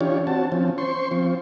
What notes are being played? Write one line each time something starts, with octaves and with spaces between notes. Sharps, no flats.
E3 C#4 D4 F4 G4 C#5
C4 F#4 A5
F3 C4 C#4
C5 C6 C#6
F3 C4